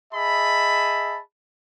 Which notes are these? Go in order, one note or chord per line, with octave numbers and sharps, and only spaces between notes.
G#4 D#5 E5 A5 B5